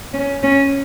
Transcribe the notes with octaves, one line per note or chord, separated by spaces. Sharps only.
C#4
C#4